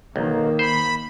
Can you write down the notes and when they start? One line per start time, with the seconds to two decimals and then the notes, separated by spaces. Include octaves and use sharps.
0.16 B1 D#3 A#3
0.59 C5 B5